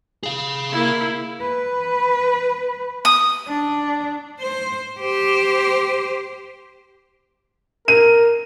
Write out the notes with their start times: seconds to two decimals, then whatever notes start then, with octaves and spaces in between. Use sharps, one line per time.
0.23 G#4 F5
0.71 A#3 E4
1.41 B4
3.05 D#6
3.47 D4
4.40 C5
5.00 G4 C5
7.88 A#4 D#7